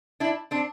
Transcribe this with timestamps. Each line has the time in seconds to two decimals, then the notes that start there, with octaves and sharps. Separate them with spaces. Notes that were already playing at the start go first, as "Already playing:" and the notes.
0.20 D4 E4
0.51 C4 D4